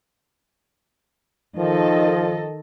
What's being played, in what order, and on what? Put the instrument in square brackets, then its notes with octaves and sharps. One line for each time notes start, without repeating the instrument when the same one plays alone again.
[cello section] D#3 A4 D#5 [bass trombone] F3